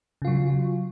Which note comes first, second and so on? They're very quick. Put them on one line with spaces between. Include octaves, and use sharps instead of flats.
C#3 F4 F#3